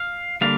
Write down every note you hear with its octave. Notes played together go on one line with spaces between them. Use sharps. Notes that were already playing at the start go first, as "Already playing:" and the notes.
Already playing: F5
D3 G3 A#3 F5